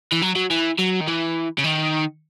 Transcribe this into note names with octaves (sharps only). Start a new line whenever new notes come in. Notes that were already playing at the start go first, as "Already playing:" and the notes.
E3
F#3
F#3
E3
F#3
D#3
E3
C#3
D#3